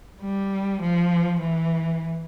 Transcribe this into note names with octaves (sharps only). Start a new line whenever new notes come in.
G3
F3
E3